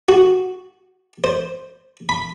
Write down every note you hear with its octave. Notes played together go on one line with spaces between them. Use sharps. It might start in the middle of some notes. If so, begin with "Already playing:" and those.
F#4
C5
B5